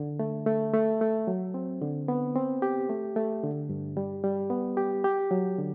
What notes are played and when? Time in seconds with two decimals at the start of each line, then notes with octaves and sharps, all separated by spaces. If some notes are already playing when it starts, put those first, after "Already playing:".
Already playing: D3
0.19 A3
0.46 A3
0.74 A3
1.01 A3
1.27 F#3
1.54 C4
1.81 D3
2.08 B3
2.35 C4
2.62 G4
2.89 A3
3.16 A3
3.43 D3
3.69 G2
3.97 G3
4.24 G3
4.50 B3
4.77 G4
5.04 G4
5.31 F#3
5.58 D3